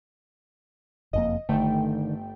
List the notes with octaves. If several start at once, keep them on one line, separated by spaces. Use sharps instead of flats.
F#1 F2 A#3 D#5
G1 D3 D#3 A3 G5